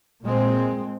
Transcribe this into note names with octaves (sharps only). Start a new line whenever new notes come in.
A#2 G#3 C4